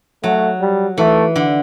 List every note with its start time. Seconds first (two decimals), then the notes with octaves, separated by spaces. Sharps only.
0.23 F#3 A3
0.61 G3
0.98 E3 A3
1.36 D3